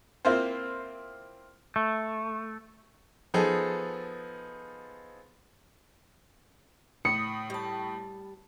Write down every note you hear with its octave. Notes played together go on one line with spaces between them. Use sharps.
A#3 C4 E4 F4 C5
A3
F3 B3 D#4 G#4 A4 B4
A2 D#6 C#7
G3 A5